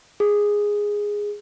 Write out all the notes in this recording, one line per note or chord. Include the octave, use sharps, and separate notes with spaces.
G#4